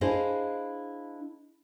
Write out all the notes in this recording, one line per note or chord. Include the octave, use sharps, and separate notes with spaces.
D4 E4 G#4 C5 D#5 F5